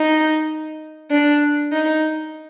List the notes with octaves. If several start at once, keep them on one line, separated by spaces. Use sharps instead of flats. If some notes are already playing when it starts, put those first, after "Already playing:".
Already playing: D#4
D4
D#4